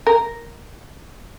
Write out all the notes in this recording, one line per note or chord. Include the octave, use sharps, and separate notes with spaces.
A#4